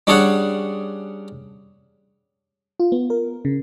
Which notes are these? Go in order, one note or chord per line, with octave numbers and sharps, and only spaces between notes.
G3 C#4 D4 G#4 C#5 F#5
F4
B3
A#4
C#3